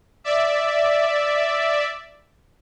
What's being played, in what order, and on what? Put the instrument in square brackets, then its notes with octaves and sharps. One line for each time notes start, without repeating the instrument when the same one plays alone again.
[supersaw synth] D5 E5